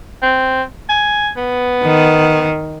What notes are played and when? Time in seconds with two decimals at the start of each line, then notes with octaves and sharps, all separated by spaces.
0.22 C4
0.89 G#5
1.37 B3
1.84 D#3